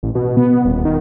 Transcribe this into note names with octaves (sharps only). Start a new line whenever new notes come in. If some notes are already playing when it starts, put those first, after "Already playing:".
A1
B2
B3
D#1
D#3